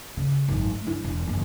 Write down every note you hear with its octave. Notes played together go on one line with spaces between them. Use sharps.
C#3
G#1 F#2
A3
G2 E4
E1
F#1 E2